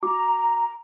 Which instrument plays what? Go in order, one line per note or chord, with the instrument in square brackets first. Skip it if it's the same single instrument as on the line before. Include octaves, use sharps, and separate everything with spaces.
[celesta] F#4 D6 [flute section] A#5